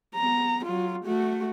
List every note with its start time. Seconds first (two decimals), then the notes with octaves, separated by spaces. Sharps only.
0.15 B3 A#5
0.66 F#3 F4
1.05 A3 F#4